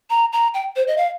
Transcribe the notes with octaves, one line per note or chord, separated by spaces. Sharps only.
A#5
A#5
G5
C5
D#5
F5